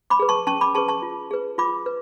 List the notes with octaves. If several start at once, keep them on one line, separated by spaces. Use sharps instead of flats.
B5 D6
G#4 B4
A5 C#6
C#4 A5 C#6
B5 D6
G#4 B4 A5 C#6
A5 C#6
F4
G#4 B4
F4 B5 D6
B4